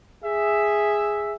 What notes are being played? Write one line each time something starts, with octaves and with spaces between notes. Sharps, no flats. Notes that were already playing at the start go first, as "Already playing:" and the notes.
G#4 E5